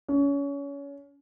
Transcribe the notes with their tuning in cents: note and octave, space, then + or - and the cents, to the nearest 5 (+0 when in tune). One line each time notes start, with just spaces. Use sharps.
C#4 +25